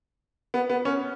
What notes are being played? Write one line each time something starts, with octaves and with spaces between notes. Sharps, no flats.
B3
B3
C#4